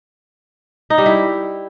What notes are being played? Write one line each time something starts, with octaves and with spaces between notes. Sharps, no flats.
D#4
G3
E4